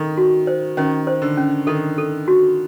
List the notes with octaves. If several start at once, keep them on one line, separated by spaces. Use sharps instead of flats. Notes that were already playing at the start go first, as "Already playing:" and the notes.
Already playing: D#3 A4
F#4
C5
D#3 C#4
C5
D3
C#4
D#3 A4
A4
F#4